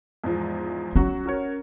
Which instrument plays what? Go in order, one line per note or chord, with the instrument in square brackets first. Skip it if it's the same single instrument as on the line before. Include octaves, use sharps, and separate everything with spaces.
[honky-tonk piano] E2 G#2 F3
[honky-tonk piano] F#3 F#4 [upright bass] C#4
[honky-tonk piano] F#4 A#4 C#5